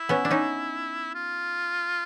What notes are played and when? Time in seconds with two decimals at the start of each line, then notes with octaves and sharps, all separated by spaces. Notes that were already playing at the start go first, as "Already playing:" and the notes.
Already playing: E4
0.09 B3 C#4
0.25 D4
0.31 C#4 D#4
1.15 F4